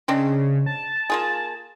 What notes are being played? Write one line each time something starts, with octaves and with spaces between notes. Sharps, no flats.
C#3 G#3 C4 D4
A5
A#3 F4 G#4